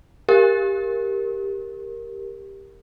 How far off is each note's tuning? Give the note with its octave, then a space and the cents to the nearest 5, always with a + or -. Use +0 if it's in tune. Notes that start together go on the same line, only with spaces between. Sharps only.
G4 +10 A#4 +0